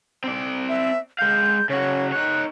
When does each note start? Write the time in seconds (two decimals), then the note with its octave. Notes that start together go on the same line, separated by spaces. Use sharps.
0.24 C4 D5
0.69 E5
1.19 G#3 F5 G6
1.70 C#3 F#4 C#5
2.12 D#4 C#5 F#6